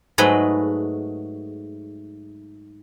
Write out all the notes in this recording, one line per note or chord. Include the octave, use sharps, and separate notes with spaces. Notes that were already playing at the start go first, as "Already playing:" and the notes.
G#2 F#3 A3 G#4 B4 D#5